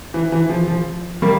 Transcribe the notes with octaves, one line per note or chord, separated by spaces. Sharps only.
E3
E3
F3
F3
G3 A#3